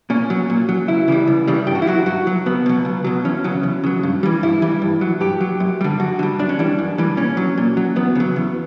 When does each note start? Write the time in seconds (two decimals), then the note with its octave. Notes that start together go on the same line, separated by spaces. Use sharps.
0.10 A#2 C#4
0.30 F#3
0.50 A#2
0.69 F#3
0.88 C#2 E4
1.08 C#3 E3 G3
1.28 C#2
1.47 C#3 E3 G3
1.67 G2 G4
1.75 F#4
1.82 E4
1.87 F#3 F#4
2.06 G2 F#4
2.27 F#3
2.46 C#2 B3
2.66 B2 F#3
2.85 C#2
3.04 B2 F#3
3.25 E2 C#4
3.44 C#3 F#3
3.63 E2
3.84 C#3 F#3
4.03 G2
4.23 E3 G3
4.43 G2 E4
4.62 E3 G3
4.82 G2
5.01 F#3
5.20 G2 G4
5.41 F#3
5.60 F#2
5.81 D3 G3
6.00 F#2 F#4
6.19 D3 G3
6.39 F#2 D4
6.49 C#4
6.59 E3 G3 D4
6.78 F#2
6.98 E3 G3
7.17 A#2 C#4
7.37 F#3
7.58 A#2
7.77 F#3
7.96 E2 B3
8.15 C#3 F#3
8.36 E2